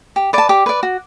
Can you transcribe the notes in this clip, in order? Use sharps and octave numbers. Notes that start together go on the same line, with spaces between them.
G4
B4 D5 A5
G4 D6
B4 D5
F#4